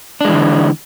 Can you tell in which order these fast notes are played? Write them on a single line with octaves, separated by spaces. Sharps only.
D4 G#3 E3 D3